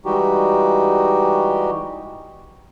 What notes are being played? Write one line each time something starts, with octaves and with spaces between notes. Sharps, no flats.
E3 G3 G#3 D#4 F#4 G4